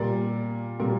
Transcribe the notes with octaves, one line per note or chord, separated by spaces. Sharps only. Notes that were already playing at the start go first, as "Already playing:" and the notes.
Already playing: A#2 G3 A#4 D5
A#2 G3 A#4